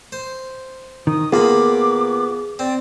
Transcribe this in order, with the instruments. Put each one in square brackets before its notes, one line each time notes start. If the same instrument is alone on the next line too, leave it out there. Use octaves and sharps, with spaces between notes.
[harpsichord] C5
[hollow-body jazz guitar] D#3 [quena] D#6
[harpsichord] D#2 A#3 B5 [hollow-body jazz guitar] B3 F4 [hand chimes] G#4 [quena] D6
[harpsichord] C4 [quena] D5